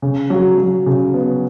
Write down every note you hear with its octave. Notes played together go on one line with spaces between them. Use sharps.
C#3
F#3
F#3
C#3
B3